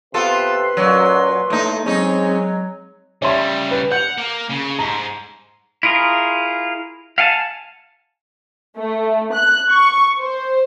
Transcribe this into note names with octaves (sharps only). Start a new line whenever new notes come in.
C3 B3 F4 A4 B4 C6
F#2 A#2 F#3 C#5
A2 A3 A#3 D#4
F#3 G#3 C4 C#4 D#4
C#3 G3 C#5 E5 C6
B4
F#5 G6 F7
A#3
C#3
G#2 A#5
E4 F4 G#4 A#4
F5 F#5 G#5 A5
A3
F#6
C#6
C5